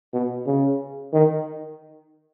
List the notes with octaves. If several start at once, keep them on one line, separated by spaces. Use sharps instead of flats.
B2
C#3
D#3